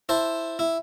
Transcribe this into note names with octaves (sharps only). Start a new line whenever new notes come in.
E4 C5 A5
E4